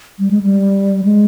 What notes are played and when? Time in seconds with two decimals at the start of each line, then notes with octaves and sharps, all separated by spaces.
0.19 G3
0.31 G#3
0.43 G3
1.04 G#3